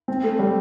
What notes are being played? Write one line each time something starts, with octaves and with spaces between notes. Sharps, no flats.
C4
A3
G3